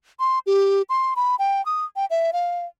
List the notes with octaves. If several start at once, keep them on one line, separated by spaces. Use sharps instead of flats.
C6
G4
C6
B5
G5
D#6
G5
E5
F5